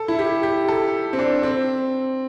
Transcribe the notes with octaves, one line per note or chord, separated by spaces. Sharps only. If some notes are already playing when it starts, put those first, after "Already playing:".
Already playing: A4
E4
G4
G4
A4
C4
D4
C4